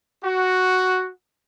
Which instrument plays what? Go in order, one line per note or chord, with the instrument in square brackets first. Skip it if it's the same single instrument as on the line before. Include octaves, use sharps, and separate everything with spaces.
[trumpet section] F#4